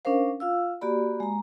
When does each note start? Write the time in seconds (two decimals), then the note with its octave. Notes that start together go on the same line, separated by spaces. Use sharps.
0.05 C#4 D4 A#4 C5 F5
0.40 F4 F5 E6
0.81 A#3 F#4 G4 D5 B5
1.20 G#3 A#5